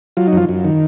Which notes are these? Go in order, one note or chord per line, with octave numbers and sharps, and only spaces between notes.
F#3 F4
D#4
F#2 F3 F4
F#2
D#3